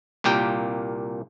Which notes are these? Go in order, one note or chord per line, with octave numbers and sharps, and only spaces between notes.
C2 A#2 A#3 G4 G5